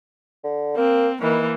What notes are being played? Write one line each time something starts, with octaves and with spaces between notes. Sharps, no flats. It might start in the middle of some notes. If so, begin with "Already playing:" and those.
D3
A#3 C4
D#3 E3 A#3